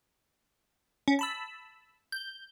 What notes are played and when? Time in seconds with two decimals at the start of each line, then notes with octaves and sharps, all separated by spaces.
1.08 C#4
1.19 A5 B5 E6
2.12 G6